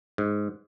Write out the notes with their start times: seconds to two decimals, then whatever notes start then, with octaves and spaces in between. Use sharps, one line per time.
0.18 G#2